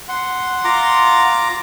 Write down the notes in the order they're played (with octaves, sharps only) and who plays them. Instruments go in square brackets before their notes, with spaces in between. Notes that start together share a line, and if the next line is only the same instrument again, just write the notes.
[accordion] F#5 C6
[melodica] F4 A#5 D6